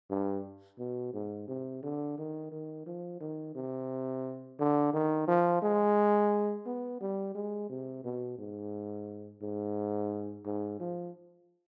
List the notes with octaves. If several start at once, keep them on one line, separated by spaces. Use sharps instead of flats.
G2
B2
G#2
C3
D3
D#3
D#3
F3
D#3
C3
D3
D#3
F3
G#3
B3
G3
G#3
C3
B2
G#2
G#2
G#2
F3